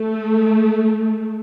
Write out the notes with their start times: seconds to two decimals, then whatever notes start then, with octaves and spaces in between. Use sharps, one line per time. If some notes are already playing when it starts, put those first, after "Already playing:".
Already playing: A3